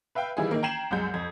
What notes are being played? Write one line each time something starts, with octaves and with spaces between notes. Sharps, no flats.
B4 E5 F5 G5
D#3 E3 G3 E4 F4 G#4
D#3 A#3
G5 A#5 G#6 C7 E7 F#7
C2 F#2 G#3 G6
F2 G#6